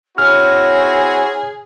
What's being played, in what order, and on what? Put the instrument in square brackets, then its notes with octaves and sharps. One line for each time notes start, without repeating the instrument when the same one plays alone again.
[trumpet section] C4 E4 F#4 [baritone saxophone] G#4 [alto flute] C#5 [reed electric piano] F6